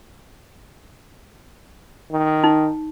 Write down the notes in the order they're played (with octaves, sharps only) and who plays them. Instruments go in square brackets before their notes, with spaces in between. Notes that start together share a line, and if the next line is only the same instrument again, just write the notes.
[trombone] D#3
[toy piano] D#4